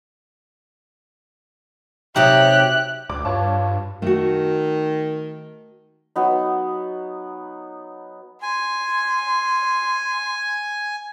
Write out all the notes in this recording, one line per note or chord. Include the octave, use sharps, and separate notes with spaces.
C3 F#3 D#4 G4 E5 F#6
D2 D6
G2 F4 B4 C#5 A5
D#3 A3 F#4
F#3 B3 D#4
G#5 C6